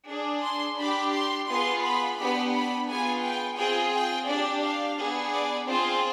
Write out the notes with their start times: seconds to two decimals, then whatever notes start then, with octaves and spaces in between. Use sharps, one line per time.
0.09 D4 G#4
0.44 C6
0.79 D4 G4 B5
1.14 C6
1.49 B3 F4 G#4 C6
1.84 B5
2.19 B3 D4 G4 B5
2.54 B5
2.89 B3 F4 G#4 G#5
3.24 G5
3.59 C4 F4 G#4 G5
3.94 G5
4.28 D4 G4 D5
4.64 F5
4.99 B3 D4 G#4
5.34 D5
5.69 C4 F4 G#4 C5